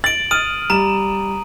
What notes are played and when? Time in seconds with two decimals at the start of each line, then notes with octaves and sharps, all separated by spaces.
0.04 A6 D7 F#7
0.31 D#6 F6 D#7
0.70 G3 A#5 E7